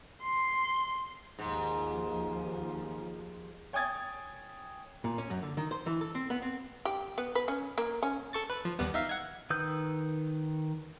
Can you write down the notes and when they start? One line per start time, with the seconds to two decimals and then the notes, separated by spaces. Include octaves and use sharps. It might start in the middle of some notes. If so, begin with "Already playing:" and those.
0.23 C6
1.39 D#2 G#2 F3
3.73 C#5 G5 G#5 D#6 G#6 A6
5.04 A#2
5.18 C#4
5.30 F#2
5.43 D3
5.57 D#3
5.71 C5
5.86 E3
6.01 A4
6.15 C4
6.30 B3
6.42 C4
6.85 G4
7.18 B3
7.35 B4
7.48 C#4
7.78 A#3
8.03 C#4
8.33 A4 C#6 A6
8.50 B4
8.65 F3
8.79 D#2 G3 B3
8.94 D#4 E5 F5
9.09 F#5 G#6
9.50 D#3 B4 D#6 E6 G6